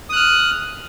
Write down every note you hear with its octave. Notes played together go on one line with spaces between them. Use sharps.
D#6 F6 F#6